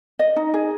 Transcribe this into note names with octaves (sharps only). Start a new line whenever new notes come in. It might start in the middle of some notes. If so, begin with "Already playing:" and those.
D#5
D#4
G#4